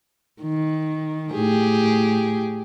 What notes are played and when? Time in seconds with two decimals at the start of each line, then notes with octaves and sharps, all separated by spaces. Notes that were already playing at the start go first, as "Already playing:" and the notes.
0.42 D#3
1.33 A2 G4 G#4